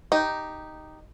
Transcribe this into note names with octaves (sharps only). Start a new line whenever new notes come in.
D#4 G4